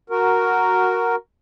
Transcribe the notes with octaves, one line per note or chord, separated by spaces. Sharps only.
F#4 A#4